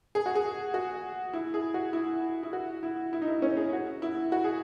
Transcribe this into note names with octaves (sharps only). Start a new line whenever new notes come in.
G#4
F#4
G#4
F#4
E4
G#4
F#4
E4
E4
F#4
E4
E4
D#4
E4
C#4
G#4
F#4
E4
F#4
G#4